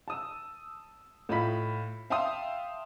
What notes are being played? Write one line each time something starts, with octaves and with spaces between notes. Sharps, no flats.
A5 D#6 E6
A2 F4 D#5 B5 B6
E5 F5 G5 A5 C6 D#6